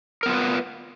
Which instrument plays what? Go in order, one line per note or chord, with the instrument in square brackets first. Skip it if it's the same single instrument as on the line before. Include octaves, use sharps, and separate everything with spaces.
[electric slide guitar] A#4
B3
F4
B4